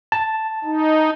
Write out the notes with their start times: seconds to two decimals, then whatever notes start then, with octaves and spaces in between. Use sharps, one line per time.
0.12 A5
0.64 D#4